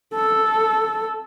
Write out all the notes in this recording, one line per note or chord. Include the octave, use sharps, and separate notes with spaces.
A4